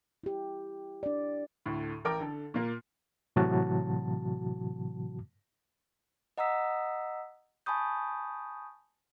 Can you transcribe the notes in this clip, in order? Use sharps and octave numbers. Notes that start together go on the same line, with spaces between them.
E4 G4
D4 D5
D2 A2
A1 A#4 G5 D6
D3 A4
A#2 A#3
A2 C3 E3 F#3 F#4 A5
D#5 F#5 A#5 D#6 E6 B6
G#5 A5 B5 C#6 D#6 G6